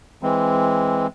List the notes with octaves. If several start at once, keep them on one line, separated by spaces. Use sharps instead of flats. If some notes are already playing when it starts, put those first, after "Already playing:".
E3 G#3 C4